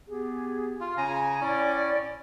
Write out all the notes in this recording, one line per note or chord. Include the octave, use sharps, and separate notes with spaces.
B3 G4 G#4
F4
C#3 G#5 A#5
A2 C#4 E4 D5